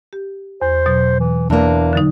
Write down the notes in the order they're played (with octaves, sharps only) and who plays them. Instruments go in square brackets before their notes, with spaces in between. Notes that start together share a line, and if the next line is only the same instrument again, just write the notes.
[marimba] G4
[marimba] E2 [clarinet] C5
[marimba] B2 F#3
[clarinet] E3
[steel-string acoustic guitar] E2 A#3 [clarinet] D4
[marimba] D3 F#3 D#4